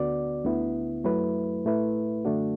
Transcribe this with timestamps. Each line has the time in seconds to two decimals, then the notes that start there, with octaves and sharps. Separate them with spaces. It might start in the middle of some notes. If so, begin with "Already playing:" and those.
Already playing: D2 D3 B3 F#4 D5
0.45 D2 D3 B3 E4
1.04 F#2 F#3 A3 E4 B4
1.65 A2 A3 E4 B4
2.25 F#2 D3 A3 D4 F#4